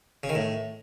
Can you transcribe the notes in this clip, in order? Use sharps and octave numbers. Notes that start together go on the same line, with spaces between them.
C#3
D#3
A2